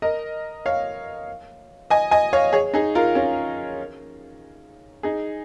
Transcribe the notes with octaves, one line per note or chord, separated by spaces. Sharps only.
A#4 D#5
C#5 F5
D#5 G#5
D#5 G#5
C#5 F5
G#4 C#5
D#4 G#4
F4 A#4
C#4 F4
D#4 G#4